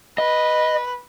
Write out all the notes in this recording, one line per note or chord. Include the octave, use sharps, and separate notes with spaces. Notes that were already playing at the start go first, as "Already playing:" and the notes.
B4 D#5